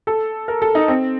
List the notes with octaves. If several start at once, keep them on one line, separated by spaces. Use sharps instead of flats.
A4
A#4
A4
D#4
C4